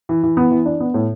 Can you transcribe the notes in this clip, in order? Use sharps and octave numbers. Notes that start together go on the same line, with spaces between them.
E3
E3
B3
E3
D4
B3
A2